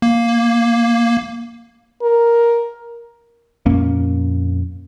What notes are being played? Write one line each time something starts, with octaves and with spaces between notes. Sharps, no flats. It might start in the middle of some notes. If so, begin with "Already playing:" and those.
A#3
A#4
F2 A#2 A#3 C#4